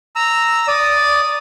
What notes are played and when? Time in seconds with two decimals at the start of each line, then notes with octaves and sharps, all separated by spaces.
0.16 A#5 E6
0.68 D5 D#6